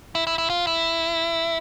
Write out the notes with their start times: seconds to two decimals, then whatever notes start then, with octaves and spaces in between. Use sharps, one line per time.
0.15 E4
0.27 E4
0.38 E4
0.50 F4
0.67 E4